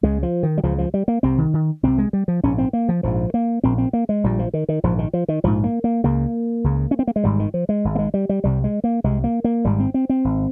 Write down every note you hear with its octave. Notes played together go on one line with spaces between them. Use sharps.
C#2 C#3 G#3
F3
D#3
G3
C#2 C#3 F3
F3
G3
A#3
C2 C3 C4
D#3
D#3
C2 C3 C4
G#3
G3
F3
A#1 G#2 C#4
C4
A#3
F3
A#1 G#2 F3
A#3
A#1 A#2 C4
C4
A#3
G#3
A#1 A#2 G3
F3
D#3
D#3
A#1 G#2 F3
D#3
F3
D#3
A#1 G#2 F3
A#3
A#3
C#2 C#3 A#3
C#2 C#3
C#4
C4
A#3
G#3
G#1 G#2 G3
D#3
F3
G#3
G#1 G#2
A#3
G#3
G3
G3
C2 C3 G3
G#3
A#3
C2 C3 G#3
A#3
A#3
G#1 G#2 G3
C4
C4
C4
G#1